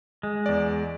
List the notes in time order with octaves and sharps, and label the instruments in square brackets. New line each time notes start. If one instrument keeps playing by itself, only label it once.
[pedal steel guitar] G#3
[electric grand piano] E2 D5